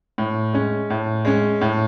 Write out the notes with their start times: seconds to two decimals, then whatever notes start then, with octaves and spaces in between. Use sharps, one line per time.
0.18 A2
0.53 G#3 C#4
0.90 A2
1.25 G#3 C#4
1.61 A2